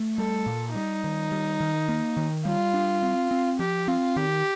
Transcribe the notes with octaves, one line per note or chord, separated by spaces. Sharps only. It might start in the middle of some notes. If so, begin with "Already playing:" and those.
Already playing: A3
G3 A4
A#2
G3 D#4
D#3
G3
D#3
A#3
D#3
G3 F4
D4
C4
C4
F3 G4
C4 F4
D#3 G4